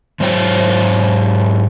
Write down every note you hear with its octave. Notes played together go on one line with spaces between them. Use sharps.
G#2 F#3 C5 C#5 G5